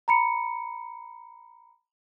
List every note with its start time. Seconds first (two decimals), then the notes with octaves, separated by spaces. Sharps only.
0.08 A#5 B5 C#7